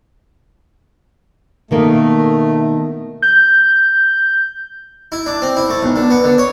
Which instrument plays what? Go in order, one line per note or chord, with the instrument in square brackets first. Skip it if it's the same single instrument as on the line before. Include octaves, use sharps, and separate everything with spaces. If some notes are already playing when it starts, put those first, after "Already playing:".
[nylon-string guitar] B2 D#3 A#3 [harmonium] A3
[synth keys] G6
[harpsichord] E4
D4
C4
E4
A3
B1
D3
B3
D3
C#5